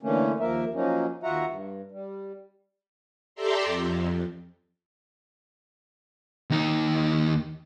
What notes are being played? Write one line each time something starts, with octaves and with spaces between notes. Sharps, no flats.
D3 E3 A3 A#3 C#4
D#2 F3 A#3 A#4 E5
F3 F#3 A#3 C#4 D#4
D#2 F4 F#4 E5 F#5 A#5
G2
G3
G4 A4 D5 E5 A#5 C6
F2
D#2 D#4